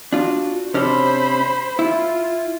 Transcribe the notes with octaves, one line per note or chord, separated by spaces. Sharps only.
D4 F4 F#4
C3 C#4 D4 C5 B5
E4 F4